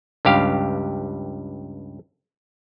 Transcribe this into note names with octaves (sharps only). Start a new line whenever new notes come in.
C#2 G2 G4 F5